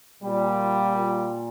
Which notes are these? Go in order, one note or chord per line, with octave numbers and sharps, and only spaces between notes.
A#2 G3
A#2